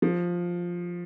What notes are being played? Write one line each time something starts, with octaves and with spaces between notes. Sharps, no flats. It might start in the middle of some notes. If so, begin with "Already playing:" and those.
F3